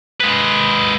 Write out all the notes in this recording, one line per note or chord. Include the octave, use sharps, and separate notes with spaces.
G#3 B4